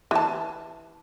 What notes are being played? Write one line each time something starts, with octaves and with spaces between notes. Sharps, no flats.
E3 A5